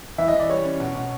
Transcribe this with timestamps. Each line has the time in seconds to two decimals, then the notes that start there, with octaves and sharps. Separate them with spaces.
0.18 E3 E5
0.28 D#5
0.34 E3
0.39 D5
0.49 G3 C#5
0.65 C#4
0.80 B2
0.95 B2